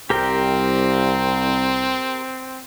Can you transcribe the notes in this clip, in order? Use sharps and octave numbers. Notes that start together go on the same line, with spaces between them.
C2 C4 G4 A#4 G5